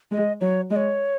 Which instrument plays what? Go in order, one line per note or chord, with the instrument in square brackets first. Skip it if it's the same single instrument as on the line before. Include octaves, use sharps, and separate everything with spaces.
[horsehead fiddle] G#3 [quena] D#5
[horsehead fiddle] F#3 [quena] C#5
[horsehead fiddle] G#3 [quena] D#5
[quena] C#5